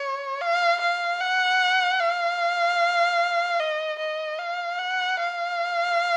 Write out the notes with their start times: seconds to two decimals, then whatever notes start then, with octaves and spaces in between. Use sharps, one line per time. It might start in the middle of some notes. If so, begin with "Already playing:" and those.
Already playing: C#5
0.41 F5
0.81 F5
1.21 F#5
2.00 F5
3.60 D#5
3.99 D#5
4.39 F5
4.78 F#5
5.19 F5